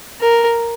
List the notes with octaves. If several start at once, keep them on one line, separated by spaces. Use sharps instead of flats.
A#4